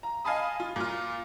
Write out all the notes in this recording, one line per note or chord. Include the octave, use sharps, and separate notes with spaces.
A#5
D#5 F5 G#5 A5 B5 D#6
F4
A#2 F4